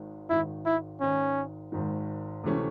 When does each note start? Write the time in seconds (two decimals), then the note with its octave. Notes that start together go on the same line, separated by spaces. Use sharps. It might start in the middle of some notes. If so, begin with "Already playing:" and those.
Already playing: G#1 G#2 D#3
0.30 G#1 G#2 D#3 E4
0.66 E4
1.00 G#1 G#2 D#3 C#4
1.72 G#1 G#2 D#3
2.43 D2 C3 E3 A3 C#4